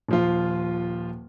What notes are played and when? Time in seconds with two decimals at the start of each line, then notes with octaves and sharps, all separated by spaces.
0.09 D#1 F3 F4